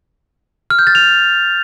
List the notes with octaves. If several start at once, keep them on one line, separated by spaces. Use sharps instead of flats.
F6
G6
A6
F7